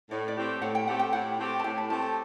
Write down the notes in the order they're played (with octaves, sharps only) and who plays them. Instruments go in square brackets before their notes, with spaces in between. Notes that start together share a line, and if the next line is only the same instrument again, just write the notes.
[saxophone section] A2 [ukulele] D5
[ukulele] D5
[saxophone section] A3 C4 G4
[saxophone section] A2 [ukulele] F#5
[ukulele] G5
[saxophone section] A3 C4 G4 [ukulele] F#5
[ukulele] G5
[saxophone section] A2 [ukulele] F#5
[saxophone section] A3 C4 G4
[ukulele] A5
[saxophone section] A2 [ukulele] G5
[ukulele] A5
[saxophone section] A3 C4 G4 [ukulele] A5
[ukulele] A5